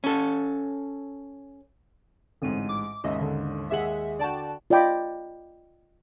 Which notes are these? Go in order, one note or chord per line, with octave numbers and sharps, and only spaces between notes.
C#4 A4
A1 G#2 D3 C4 D#7
D6
D#2 G#2 C#3 D#5 E5
D3
D#2 G#3 E5 F#5 F#7
D3 F#4 D5 G5 A5
F4 D5 D#5 G5 B5 D6